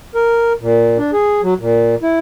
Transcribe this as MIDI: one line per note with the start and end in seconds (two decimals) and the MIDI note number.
0.15 0.53 70
0.61 0.98 46
0.98 1.11 62
1.13 1.41 68
1.43 1.54 54
1.59 1.95 46
2.03 2.19 64